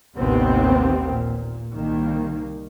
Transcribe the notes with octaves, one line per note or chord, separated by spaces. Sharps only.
A1 D#2 C3 D#3 B3 C4
A#2
C2 D#3 A#3